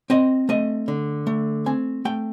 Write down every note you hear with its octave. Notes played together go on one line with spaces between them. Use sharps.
C4 D#5
A3 D#5
D3
A3
C4 G#5
A3 G5